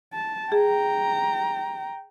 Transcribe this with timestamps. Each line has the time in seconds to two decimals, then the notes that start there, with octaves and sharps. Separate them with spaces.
0.13 A5
0.52 G#4 G5 A#5